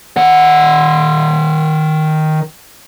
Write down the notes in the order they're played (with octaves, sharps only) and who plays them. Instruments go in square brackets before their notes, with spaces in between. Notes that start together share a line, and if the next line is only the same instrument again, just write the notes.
[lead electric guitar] D#3 F#5